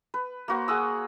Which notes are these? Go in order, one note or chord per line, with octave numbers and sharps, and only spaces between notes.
B4
A#3 F#4 C5
G#4 F#5 D#6 E6